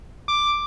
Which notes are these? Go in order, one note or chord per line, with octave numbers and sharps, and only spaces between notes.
D6